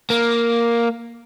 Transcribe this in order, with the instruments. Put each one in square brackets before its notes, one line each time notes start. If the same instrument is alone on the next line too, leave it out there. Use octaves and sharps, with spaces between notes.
[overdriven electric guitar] A#3